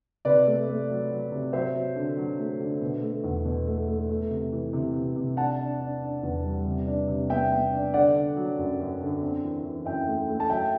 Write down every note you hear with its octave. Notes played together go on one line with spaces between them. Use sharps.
C3 B4 D5
A3
A3
F#3
F#3
C3
F#3 C5 E5
F#3
D3
F#3
A3
D3
B2
A3
E2
B2
A3
A3
A3
C3
E3
C3
C3
C3
D4 F#5 A5
D4
D4
D4
E2
G3
C3
D4
C3
B3 E5 G5
B3
D4
D3 D5 F#5
D3
F#3
F#2
F#2
D3
C4
E3
E3
F#2 E5 G5
A3
A3
A5
F#3 E5 G5